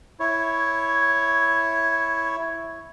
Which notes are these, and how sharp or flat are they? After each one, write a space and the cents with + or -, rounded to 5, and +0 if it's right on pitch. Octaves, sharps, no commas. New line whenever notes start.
E4 +0 C#5 +0